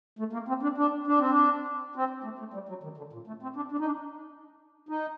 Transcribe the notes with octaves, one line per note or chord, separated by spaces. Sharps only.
A3
A#3
C4
D4
D4
D4
C4
D4
C4
A3
A3
G3
F#3
D#3
D3
A#2
A3
C4
D4
D4
D#4
D4
D#4